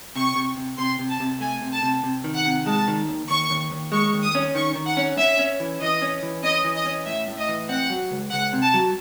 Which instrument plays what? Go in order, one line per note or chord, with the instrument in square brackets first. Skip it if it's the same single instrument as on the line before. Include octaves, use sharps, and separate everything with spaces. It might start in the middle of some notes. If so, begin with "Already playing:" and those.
[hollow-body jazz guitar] C3 [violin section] C#6
[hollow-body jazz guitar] C3
C3
[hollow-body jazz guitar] C3 [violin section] C6
[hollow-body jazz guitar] C3
[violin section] A5
[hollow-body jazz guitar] C3
[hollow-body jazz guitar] A3 [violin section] G#5
[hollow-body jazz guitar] C3
[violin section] A5
[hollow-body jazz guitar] C3
C3
D#3
[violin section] F#5
[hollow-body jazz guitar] C3
[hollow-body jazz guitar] G#3 [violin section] A5
[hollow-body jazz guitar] D#3
D#2
[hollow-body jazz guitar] D#2 [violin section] C#6
[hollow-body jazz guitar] D#2
D#2
[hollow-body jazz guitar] G#3 [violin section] C#6
[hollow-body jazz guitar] D#2
[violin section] D#6
[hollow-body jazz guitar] C#4
[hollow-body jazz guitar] D#3 [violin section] C#6
[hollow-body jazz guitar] D#3
[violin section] F#5
[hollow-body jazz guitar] C#4
[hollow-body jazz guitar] C#4 [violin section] E5
[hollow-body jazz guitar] C#4
E3
[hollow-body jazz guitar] E3 [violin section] D#5
[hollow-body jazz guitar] C#4
E3
[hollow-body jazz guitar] C#4 [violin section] D#5
[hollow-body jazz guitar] E3
[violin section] D#5
[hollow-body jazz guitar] C#4
[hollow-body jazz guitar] A2 [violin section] E5
[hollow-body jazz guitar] A2
[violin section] D#5
[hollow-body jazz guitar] E3
[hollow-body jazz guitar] C4 [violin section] F#5
[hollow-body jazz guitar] F#3
C#2
[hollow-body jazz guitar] C#2 [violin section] F#5
[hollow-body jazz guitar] C3
[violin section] A5
[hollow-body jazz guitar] F#3